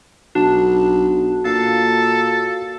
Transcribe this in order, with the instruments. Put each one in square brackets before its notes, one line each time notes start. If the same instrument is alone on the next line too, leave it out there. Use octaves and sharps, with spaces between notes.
[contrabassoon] B1 [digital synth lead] D4 [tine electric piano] F#4 A5
[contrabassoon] A#2 [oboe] A4 [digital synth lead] F5